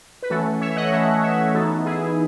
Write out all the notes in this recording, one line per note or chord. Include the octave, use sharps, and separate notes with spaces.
B4
E3 A3 C#4 F#4 A4
C#5 E5
D#5 F#5
E3 A3 C#4 C#5 E5
C#5 E5
E3 B3 D#4 F#4 A4
E4 G#4